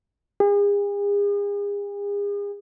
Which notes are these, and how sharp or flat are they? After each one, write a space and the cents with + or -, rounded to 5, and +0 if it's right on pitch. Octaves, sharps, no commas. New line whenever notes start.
G#4 -40